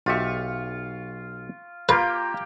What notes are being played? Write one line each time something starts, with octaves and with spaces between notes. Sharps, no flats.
B1 F4 G4 E5 C#6
A#3 F4 G4 B4